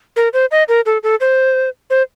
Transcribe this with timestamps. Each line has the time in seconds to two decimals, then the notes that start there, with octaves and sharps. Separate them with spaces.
0.16 A#4
0.33 C5
0.51 D#5
0.69 A#4
0.86 A4
1.03 A4
1.21 C5
1.90 C5